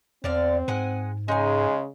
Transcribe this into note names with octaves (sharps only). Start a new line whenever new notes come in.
E2 D3 C4 D5 F5
G#2 G#3 F#5 G#5
C#3 G#3 D#4 G#5